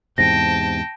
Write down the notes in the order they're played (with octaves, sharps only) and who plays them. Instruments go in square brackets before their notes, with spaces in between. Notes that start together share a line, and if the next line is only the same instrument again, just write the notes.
[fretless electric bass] E2 G#2 C3 [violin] G5 A5 [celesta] A#6